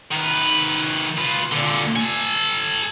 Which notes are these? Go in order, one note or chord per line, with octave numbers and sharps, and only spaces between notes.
D#3 B4
F4 B4
A#2 D3
A4 G#5